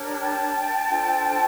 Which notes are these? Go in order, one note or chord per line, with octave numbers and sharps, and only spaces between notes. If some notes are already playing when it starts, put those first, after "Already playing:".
Already playing: D4 G4 A#4 C#5
G5 A5
D4 F4 A4 C5